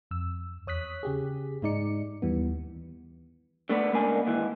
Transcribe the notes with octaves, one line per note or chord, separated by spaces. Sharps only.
F2 E6
E2 C#5 D#6 F#6 B6
C#3 G4 G#4
G#2 G#3 D#4 D5 C#7
D#2 E3 G3 B3
D3 A3 B3 D5
C#2 G#2 A#3 B3 D4 G#5
D#2 G#2 E3